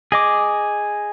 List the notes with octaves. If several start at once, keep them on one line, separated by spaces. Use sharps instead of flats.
G#4 D#5 D6